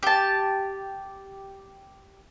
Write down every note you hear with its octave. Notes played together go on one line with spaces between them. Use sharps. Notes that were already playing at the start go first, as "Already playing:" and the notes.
G4 A5